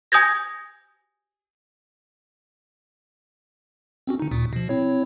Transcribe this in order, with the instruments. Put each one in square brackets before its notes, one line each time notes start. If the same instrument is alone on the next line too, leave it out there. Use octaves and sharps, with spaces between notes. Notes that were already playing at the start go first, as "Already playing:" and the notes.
[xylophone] G#5 D#6 G6 G#6 A#6
[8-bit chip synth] C4 C#4 F#4
D3 D#4
D2 A#2
B2 F3
C4 E4 C#5